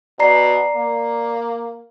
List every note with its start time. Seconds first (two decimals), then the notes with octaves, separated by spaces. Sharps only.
0.20 B2 D5 A#5 C7
0.76 A#3